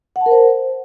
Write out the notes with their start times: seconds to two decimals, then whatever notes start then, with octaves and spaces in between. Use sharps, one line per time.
0.16 F#5
0.21 A5
0.26 A#4
0.31 C5